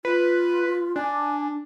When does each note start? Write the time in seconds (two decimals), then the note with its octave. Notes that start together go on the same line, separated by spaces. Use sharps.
0.05 F4 B4
0.96 D4 G#5